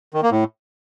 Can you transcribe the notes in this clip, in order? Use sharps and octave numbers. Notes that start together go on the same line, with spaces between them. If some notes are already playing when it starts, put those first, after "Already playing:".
D#3
A#3
A2